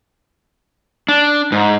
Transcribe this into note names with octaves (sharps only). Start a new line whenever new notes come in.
D4
G#2